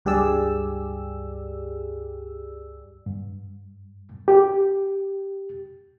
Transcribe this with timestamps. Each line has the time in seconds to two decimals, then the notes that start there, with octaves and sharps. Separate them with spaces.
0.05 C#2 G2 G4 G#4 D5 E6
3.06 G2
4.28 G4